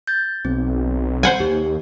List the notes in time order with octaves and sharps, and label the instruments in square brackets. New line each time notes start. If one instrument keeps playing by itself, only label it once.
[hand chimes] G6 A6
[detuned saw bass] B1 [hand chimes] C4
[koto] C5 F#5 G#5
[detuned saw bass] D#2 [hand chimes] G4